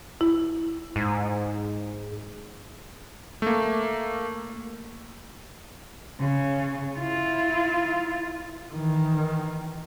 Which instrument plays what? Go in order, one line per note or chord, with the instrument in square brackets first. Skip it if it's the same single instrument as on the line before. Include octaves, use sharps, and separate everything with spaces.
[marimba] E4
[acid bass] G#2
[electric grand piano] A3 A#3
[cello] C#3
E4 F4
[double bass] D#3 E3